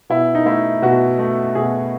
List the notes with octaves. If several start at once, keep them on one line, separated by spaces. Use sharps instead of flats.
B2 E4
D#4
A3 E4
B2 F#4
A3
B2 G#4